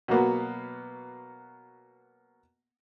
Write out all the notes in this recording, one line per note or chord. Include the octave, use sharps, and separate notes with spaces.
B2 F#3 A#3 B3